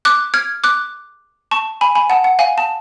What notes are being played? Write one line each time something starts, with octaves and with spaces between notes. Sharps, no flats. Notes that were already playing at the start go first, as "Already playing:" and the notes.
D6 F#6
F6 G#6
D6 F#6
A5 C#6
G#5 B5
G#5 B5
F#5 A5
F#5
F5 G#5
A5